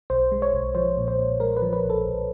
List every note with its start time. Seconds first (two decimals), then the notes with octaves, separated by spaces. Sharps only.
0.10 B1 C5
0.32 G#3
0.42 C#5
0.53 B1
0.75 F3 C5
0.97 A#2
1.08 C5
1.19 A#2
1.40 G#3 A#4
1.57 B4
1.62 F3
1.73 B4
1.84 B1
1.90 A4
2.06 B1